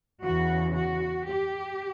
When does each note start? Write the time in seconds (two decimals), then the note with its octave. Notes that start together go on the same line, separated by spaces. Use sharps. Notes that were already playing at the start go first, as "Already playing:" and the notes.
0.24 E2 C#3 E3 F#4
0.75 F#4
1.27 G4